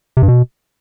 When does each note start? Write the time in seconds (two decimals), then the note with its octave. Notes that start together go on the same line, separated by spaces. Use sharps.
0.17 C3
0.23 G2
0.28 B2